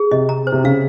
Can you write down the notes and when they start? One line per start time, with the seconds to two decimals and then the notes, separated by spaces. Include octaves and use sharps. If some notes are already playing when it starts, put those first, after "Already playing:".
Already playing: G#4
0.11 C3 D#5
0.29 A#5
0.47 C5
0.52 C3
0.64 C#3 F5